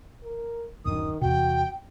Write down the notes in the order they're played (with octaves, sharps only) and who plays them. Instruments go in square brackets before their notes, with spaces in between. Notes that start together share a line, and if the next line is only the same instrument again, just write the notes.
[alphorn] A#4
[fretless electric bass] D1 F#2 D4 [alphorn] D#3 [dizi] D#6
[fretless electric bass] E2 C3 [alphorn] F#4 [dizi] G5